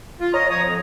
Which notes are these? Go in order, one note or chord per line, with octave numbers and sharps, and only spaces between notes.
F4
C#5 D#5 A#5
F3 C#5 A#5 D#6
F2